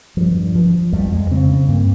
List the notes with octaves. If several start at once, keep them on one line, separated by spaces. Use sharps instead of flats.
G2 F3
F3
F2 G3
G#3
C#3 C4
C4
G2 A#3